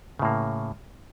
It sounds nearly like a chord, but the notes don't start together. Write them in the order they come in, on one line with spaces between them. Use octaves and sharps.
C#3 A2 A#3